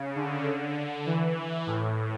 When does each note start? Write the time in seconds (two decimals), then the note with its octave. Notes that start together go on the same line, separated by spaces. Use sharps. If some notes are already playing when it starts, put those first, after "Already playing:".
Already playing: C#3
0.16 D3
1.06 E3
1.67 A2